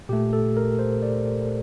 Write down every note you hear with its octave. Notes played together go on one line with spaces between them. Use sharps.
A#2 A3 G4
A4
A#4
C5
D5